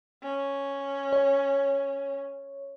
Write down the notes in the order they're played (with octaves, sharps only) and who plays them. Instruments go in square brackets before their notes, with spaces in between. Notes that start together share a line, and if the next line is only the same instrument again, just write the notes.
[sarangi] C#4
[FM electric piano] C#5